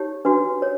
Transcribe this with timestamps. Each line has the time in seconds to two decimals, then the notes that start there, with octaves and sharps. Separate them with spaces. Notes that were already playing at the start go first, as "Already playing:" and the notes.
Already playing: D#4 G4 C#5
0.25 D4 F#4 B4
0.62 C#5